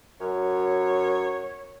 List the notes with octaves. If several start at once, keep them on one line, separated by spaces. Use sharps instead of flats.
F#2 C#5